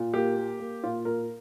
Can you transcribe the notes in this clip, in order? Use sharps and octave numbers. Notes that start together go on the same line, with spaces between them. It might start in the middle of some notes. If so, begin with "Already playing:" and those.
Already playing: A#2
A#3 G4
A#3
A#3
A#2 F4
A#2 A#4